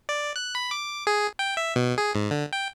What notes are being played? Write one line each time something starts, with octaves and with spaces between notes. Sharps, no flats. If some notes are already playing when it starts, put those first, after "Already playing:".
D5
F#6
B5
D6
G#4
G5
E5
B2
G#4
G#2
D3
G5